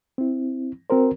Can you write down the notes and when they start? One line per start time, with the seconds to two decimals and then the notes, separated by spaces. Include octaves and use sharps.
0.18 C4 E4
0.90 C4 F#4 A#4 C5